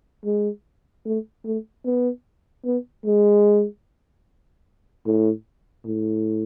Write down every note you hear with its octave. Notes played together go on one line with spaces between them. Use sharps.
G#3
A3
A3
B3
B3
G#3
A2
A2